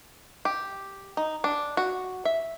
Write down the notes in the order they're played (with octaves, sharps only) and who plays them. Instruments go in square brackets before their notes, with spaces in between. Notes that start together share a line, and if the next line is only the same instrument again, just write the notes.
[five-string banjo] G4
D#4
D4
F#4
E5